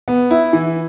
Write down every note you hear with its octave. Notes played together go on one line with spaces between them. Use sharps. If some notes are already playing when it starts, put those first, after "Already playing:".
B3
E4
E3